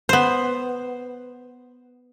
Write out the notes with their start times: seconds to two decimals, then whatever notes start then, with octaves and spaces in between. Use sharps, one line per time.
0.09 B3 C5